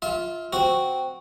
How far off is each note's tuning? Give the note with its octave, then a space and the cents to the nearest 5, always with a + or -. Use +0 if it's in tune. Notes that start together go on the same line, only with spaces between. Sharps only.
F4 +0 E5 -30
C4 -5 F#4 -5